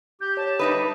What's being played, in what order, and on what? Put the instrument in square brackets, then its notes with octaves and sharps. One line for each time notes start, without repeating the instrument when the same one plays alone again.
[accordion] G4 [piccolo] G6
[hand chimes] C#5 [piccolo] A5
[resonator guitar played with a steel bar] G3 D#4 B4 [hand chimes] E5 D#6